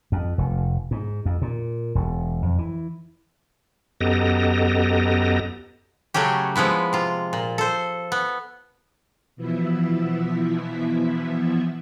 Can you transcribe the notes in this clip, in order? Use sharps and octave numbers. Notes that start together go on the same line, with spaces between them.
F2
F1
G#2
F2
A#2
E1
F2
E3
F#2 B3 G4 A4 D#5 A#5
C#3 F#3 A3 C#4 G4
F3 G#3 B3 E4
C3 F4
A#2
A4 C5
B3
B2 E3 F3 B3 E4 E5